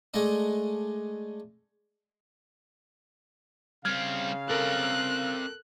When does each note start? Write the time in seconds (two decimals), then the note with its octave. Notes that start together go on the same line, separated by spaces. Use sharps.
0.14 G#3 A3 D4 D#5
3.85 C#3 G3 C4 F5 F6 G#6
4.49 C4 A4 A#4 D5 F#6